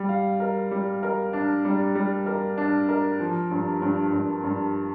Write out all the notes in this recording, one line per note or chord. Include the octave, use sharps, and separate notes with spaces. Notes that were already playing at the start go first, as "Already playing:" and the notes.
Already playing: G3
F5
A#4
G3
A#4
D4
G3
G3
A#4
D4
A#4
F3
G2
G2
G2
G2